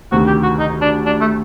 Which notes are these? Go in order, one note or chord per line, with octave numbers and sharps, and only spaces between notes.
D2 C3 D#3 F#4
G4
F#4
D#4
D4
D4
A3